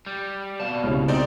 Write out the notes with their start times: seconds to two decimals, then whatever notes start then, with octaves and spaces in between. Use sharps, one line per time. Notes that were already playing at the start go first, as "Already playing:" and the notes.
0.06 G3
0.60 B2 D5 F5 A5
0.83 C2 C#3 G#3 C#5 F6
1.08 G#3 C4 D#4 D5